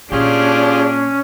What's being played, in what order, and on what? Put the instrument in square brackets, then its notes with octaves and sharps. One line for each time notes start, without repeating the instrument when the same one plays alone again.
[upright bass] A#2 [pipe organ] C#4 [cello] D4 [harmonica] F4 G4 G#4